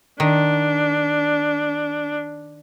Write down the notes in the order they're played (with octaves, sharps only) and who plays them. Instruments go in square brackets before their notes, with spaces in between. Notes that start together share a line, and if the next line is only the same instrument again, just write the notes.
[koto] D#3 [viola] D4